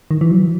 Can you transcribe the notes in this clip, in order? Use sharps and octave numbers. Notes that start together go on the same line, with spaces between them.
D#3
E3
F#3
E3